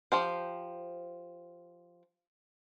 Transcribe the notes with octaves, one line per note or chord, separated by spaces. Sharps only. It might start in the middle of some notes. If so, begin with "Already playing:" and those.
F3 G4 C5